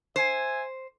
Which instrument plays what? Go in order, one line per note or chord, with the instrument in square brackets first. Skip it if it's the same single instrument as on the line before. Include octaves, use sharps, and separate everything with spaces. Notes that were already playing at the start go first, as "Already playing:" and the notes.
[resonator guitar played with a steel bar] C5 [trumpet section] E5 G#5